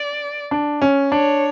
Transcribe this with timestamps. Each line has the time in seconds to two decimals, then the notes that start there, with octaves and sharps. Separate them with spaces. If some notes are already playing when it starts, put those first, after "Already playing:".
Already playing: D5
0.51 D4
0.82 C#4
1.12 D4 C#5